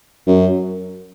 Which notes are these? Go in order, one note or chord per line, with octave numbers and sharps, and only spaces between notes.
F#2